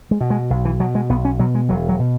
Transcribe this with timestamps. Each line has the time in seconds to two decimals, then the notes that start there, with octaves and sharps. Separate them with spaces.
0.11 G#3
0.21 B2
0.30 G#3
0.50 B1
0.65 E3
0.80 B2 F#3
0.95 G#3
1.10 B1 B3
1.25 C#4
1.39 B2 F#3
1.55 G#3
1.69 E1 F#3
1.89 F#3
1.99 B2